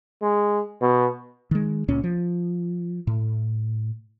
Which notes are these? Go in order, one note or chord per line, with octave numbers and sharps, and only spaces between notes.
G#3
B2
D#3 G#3
C#2 A#2 C#4
F3
A2